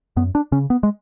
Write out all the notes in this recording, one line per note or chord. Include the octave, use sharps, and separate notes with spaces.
F#2 B3
D4
C#3 C#4
B3
G#3